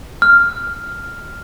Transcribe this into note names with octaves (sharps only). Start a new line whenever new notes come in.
F6